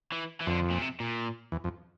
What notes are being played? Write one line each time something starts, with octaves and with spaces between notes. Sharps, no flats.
E3
E3
F2 D3
A#2
C3
A#2
E2
F2